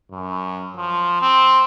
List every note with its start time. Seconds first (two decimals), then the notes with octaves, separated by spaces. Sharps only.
0.11 F#2
0.77 F3
1.22 C4